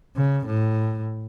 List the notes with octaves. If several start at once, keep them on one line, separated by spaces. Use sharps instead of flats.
C#3
A2